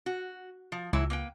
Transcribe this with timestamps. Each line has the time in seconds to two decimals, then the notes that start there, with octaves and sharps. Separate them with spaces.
0.06 F#4
0.72 F3
0.93 C#2 E3 F#3 E4
1.10 A#3 B4 G5